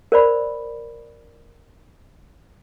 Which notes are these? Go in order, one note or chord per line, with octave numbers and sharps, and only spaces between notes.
A#4 C5 D5 B5